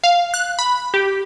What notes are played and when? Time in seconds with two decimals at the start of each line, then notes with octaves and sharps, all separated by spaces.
0.04 F5
0.34 F#6
0.59 B5
0.94 G4